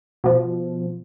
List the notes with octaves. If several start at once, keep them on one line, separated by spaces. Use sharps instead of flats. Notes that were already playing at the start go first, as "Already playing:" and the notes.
B2 F3